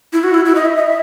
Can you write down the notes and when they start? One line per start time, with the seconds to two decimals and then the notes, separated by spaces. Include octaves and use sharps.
0.13 E4
0.24 F#4
0.34 E4
0.45 E4
0.55 D#5
0.65 E5
0.76 D#5
0.87 E5